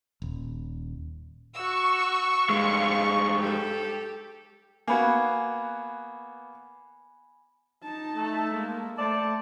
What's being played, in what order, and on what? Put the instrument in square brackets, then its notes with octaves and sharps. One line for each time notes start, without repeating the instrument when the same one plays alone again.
[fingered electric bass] D#1
[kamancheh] F#4 E6 [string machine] C#6
[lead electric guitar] G2 G#3 [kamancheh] F5
[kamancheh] G4 A4
[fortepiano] A#3 B3 F#4 [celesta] G#5 B5 G#6
[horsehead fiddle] D#4 A5
[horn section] A3
[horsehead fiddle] G#3 A#3
[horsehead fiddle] A3 [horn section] C5 D5 A5